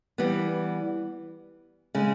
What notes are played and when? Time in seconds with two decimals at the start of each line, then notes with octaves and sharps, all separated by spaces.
0.18 E3 G3 B3
1.95 C#3 G#3